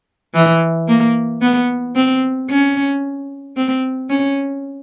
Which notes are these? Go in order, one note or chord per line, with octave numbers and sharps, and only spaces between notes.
E3
A#3
B3
C4
C#4
C4
C#4